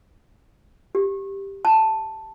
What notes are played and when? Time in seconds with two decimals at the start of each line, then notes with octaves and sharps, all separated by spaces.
0.95 G4
1.65 A5